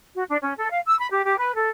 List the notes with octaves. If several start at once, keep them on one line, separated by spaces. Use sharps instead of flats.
F#4
D4
C#4
A4
F5
E6
B5
G4
G4
B4
A4